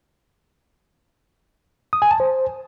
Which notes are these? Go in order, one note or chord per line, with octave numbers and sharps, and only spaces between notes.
D#6
G#5
A5
C5